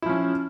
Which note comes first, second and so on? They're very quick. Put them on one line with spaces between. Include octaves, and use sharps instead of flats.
E4 F3 C#4